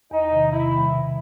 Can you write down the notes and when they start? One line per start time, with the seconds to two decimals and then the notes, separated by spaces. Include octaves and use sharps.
0.11 E2 D#4
0.32 C3 D#3
0.51 C3 E4
0.72 D#3 G3
0.92 B2